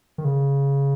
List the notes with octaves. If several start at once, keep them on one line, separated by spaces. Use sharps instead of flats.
D#3
C#3